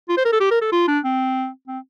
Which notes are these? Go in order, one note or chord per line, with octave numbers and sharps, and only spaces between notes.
F4
C5
A#4
A4
G4
A#4
A4
F4
D4
C4
C4